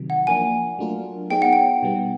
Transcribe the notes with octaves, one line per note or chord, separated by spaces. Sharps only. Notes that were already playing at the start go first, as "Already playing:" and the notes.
Already playing: C3 D#3 F#3
F#5
F3 A#3 D4 G#5
F#3 A3 D4 F4 A#4
B3 D#4 G#4 C#5 G5
F#5
G5
B2 G3 B3